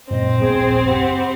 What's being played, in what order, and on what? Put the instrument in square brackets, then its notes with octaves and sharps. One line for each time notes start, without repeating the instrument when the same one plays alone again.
[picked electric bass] F#2 A#2 [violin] C4 [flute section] D#5
[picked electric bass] D#1 A#1 B3 [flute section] G#4 C5 G5
[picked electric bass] F#1 [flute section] G4 F#5 B5